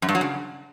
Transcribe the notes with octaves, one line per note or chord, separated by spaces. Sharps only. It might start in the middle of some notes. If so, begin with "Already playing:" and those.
F#2
G2
F#3
C#3